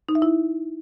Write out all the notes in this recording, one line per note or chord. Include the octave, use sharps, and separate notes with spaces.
D#4
E5
E4